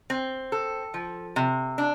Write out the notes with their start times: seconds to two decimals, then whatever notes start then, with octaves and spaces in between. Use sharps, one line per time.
0.10 C4
0.52 A4
0.94 F3
1.36 C3
1.78 D4